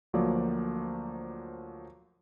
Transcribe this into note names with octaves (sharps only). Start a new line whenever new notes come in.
D2 F3 F#3 A#3 D5